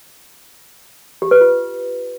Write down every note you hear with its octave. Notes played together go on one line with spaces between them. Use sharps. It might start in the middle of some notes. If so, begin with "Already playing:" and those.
G4
B4
F4